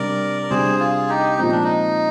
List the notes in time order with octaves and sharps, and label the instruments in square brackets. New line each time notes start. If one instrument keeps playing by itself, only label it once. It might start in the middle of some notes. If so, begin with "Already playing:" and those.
Already playing: [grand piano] C3 G3 D4 [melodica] A#4 D5
[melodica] A#4
[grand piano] C3 G3 D4 [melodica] G#4 C5
[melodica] F4 G#4
D#4 G4
[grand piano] A#2 F3 G#3 C4 [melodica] D#4
[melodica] D4
D#4